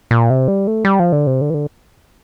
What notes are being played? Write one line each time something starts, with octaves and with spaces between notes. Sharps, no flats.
A#2
C3
G3
A3
G3
F3
D3
C3
D3
E3
D3